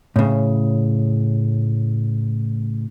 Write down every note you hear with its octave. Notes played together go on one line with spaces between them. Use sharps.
A2 C#3